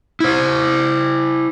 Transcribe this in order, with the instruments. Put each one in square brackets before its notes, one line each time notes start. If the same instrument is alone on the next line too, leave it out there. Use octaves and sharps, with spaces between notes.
[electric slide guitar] E4 C5